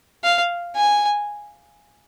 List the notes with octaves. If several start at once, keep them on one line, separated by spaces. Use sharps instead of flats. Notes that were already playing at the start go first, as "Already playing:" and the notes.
F5
G#5